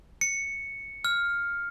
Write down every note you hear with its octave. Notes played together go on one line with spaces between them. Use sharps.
C#7
F6